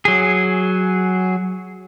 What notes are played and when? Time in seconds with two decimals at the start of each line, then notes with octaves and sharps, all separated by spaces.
0.05 F#3 G#4